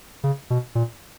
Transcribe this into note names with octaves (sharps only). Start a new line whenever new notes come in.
C#3
B2
A#2